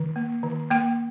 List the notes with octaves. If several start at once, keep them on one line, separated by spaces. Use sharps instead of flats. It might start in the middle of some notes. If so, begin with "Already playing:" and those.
Already playing: D#3
A#3
D#3
A#3 G5